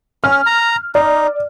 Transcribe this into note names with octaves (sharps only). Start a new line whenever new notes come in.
C#4 F6
A#5
D#4 D5